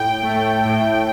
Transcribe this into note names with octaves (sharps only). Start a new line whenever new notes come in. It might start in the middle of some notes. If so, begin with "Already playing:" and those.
Already playing: A2 G5
A3
A2